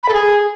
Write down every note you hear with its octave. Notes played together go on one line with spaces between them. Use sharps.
B5
A4
G#4